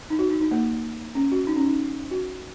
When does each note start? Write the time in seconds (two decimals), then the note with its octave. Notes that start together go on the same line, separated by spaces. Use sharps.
0.10 D#4
0.19 F#4
0.30 D#4
0.41 D#4
0.51 A#3
1.15 C#4
1.32 F#4
1.47 D#4
1.56 C#4
1.66 D#4
2.11 F#4